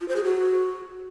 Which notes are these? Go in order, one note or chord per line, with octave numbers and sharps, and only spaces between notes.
F4
C5
G#4
F#4